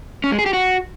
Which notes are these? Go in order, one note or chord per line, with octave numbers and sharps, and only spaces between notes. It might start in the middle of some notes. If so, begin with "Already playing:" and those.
C#4
G#3
G#4
G4
F#4